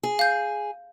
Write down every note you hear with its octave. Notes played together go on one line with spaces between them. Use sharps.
G#4
F5 G6